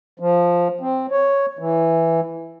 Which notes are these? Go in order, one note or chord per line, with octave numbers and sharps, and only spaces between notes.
F3
C4
C#5
E3